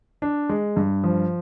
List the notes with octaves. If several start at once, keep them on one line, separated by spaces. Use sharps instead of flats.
D4
G#3
G2
F3